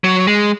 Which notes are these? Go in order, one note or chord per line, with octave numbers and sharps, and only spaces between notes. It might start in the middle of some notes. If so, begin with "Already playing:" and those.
F#3
G#3